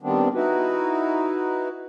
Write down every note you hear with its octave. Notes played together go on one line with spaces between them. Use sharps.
D#3 G3 B3 C4 D4
D#4 E4 F#4 B4